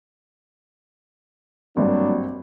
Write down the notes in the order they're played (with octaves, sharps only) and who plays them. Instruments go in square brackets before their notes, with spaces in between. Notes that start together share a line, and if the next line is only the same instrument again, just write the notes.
[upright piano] G#1 G2 G3 [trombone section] F#3 A#3 D4